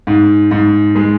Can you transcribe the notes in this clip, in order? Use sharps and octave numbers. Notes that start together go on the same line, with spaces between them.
G#2
G#2
G#3